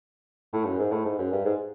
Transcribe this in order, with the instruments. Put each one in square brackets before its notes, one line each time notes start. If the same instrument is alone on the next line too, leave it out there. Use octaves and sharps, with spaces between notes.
[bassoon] A2
F#2
G#2
A2
G#2
F#2
G2
G#2